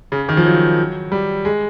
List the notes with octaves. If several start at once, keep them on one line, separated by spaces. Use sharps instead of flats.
C#3
D#3
F3
F#3
G3
G#3